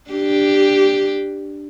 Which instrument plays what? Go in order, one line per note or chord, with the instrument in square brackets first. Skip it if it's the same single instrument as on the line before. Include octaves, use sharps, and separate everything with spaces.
[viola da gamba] D4 G4